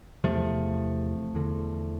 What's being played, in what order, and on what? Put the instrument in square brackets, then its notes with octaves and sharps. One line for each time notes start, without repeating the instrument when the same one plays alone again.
[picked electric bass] E2 C3 F3 A3
E2 D3